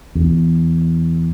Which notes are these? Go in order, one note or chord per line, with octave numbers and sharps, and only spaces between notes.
E2